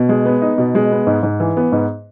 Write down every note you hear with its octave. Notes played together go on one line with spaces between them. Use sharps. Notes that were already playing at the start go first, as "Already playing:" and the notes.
Already playing: B2
G#3
B3
D#4
B2
G#3
B3
G#2
G#2
E3
B3
G#2